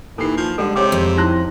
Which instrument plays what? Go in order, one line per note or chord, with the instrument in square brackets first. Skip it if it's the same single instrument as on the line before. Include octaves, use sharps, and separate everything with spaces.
[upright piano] D#2 C7 [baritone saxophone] E3 [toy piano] A4
[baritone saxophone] F3
[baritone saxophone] D3 [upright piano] G3 G#3 [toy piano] A4
[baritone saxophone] C3 [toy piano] G4 C#5 D6
[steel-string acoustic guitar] F2
[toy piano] D#4 E4 [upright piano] C6 F#6 A#6